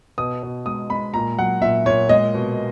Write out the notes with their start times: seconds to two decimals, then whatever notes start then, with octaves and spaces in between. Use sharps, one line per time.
0.18 B2 D#6
0.43 B2
0.66 G#3 D#6
0.90 G#3 B5
1.14 A#2 A#5
1.39 F#3 F#5
1.62 A#2 E5
1.86 A#2 C#5
2.09 G#3 D#5
2.34 B2